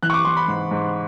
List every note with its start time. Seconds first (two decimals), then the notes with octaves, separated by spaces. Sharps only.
0.03 E3 F#6
0.10 C#6
0.14 D6
0.25 E3 C6
0.37 B5
0.48 G#2
0.71 G#2